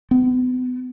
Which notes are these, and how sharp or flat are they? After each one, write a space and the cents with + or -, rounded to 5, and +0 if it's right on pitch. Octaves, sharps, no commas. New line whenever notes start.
B3 +35